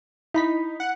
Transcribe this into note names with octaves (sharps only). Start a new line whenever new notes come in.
D#4 E4 B5 B6
F#5